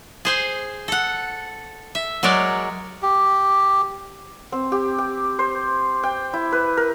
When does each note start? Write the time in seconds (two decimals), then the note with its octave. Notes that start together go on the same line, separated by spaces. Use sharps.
0.25 G#4 C5 G#5
0.88 A4 F#5
1.95 E5
2.23 F#3 G#3 A#4 C#5 D5
3.02 G4
4.52 C4
4.72 G4
4.98 G5
5.39 C5
6.03 G5
6.33 E4
6.52 B4
6.77 A#4